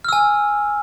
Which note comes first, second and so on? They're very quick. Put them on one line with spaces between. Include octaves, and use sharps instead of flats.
F6 E6 G#5